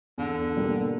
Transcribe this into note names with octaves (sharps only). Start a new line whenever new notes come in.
E2 D3
B2 G3 A#3